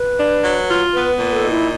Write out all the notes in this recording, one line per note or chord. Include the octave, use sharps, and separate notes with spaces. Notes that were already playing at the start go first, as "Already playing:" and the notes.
Already playing: B4
D4
F#3
F4
B3 B4
A#2
A4
D#4
E4